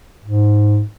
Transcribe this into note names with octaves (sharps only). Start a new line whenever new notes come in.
G#2